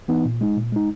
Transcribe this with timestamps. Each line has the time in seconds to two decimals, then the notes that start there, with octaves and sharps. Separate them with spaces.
0.08 E3 B3 D#4
0.25 A#2
0.41 G#3 D#4
0.57 A#2
0.72 G#3 D#4